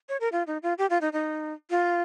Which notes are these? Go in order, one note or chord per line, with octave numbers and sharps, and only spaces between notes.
C#5
A#4
F4
D#4
F4
G4
F4
D#4
D#4
F4